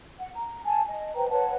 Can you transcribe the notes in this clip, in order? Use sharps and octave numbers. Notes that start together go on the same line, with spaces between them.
F#5
A#5
G#5 A5
D#5
B4 C5 G5 A#5
B4 C#5 F#5 A5